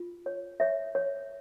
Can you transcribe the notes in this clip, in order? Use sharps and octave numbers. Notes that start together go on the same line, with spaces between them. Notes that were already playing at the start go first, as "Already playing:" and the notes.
Already playing: F4
C#5
C#5 E5
C#5